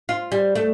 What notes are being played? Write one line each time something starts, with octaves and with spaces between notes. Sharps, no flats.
F4
G3
A3